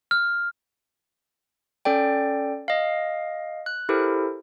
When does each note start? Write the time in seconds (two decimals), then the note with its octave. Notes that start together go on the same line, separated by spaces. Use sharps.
0.11 F6
1.85 C#4 A4 D5 G5
2.68 D#5 F5
3.66 F#6
3.89 E4 G4 A4 A#4 C5